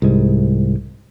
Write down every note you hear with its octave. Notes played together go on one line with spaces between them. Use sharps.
C2 G#2